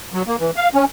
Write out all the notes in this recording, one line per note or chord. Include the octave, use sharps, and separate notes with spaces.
F#3
A#3
E3
F5
C#4